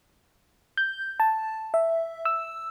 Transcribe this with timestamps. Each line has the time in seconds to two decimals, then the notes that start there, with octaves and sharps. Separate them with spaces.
0.77 G6
1.20 A5
1.74 E5
2.25 E6